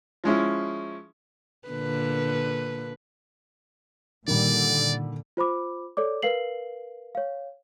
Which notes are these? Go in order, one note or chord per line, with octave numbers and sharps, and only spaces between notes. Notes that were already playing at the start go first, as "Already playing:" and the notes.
F3 G#3 C#4 E4
A#2 D3 B4
A#2 D3 D#3 G3 D5
F4 C5 B5 D6
A4 C#5 D5 D6
A#4 B4 F5 C7 F#7
C#5 F5